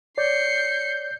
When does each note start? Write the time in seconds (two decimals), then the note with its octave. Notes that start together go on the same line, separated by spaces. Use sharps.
0.18 C#5 D5 G6 C7 C#7